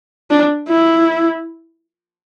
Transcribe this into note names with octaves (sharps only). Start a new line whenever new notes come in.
D4
E4